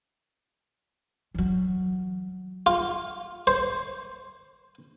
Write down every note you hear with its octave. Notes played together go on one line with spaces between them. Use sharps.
E3 F#3
F4
C5